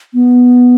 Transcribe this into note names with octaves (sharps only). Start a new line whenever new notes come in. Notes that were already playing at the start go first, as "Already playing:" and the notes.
B3